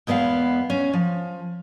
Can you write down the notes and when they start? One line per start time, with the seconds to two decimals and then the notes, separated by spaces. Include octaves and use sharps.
0.07 E2 G#3 B3 D#5 F5
0.70 C#4
0.93 F3